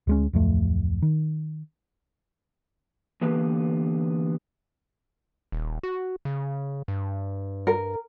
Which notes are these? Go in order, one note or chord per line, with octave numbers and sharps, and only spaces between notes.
D2 G#3 C#4
D1 F2 A3
D#3
D3 E3 A#3 B3 G4 B4
D#1
F#4
C#3
G2
A#4